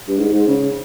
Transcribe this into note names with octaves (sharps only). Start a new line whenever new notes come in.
G2
G#2
G#2
C#3